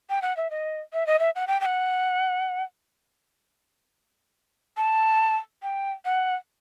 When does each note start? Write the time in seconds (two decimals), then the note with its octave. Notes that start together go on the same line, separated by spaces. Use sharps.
0.10 G5
0.22 F#5
0.37 E5
0.50 D#5
0.93 E5
1.07 D#5
1.19 E5
1.36 F#5
1.47 G5
1.61 G5
1.65 F#5
4.77 A5
5.63 G5
6.05 F#5